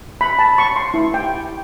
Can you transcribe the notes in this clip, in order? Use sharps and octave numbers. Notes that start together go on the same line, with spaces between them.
B5
A5
C#6
C6
E4
G5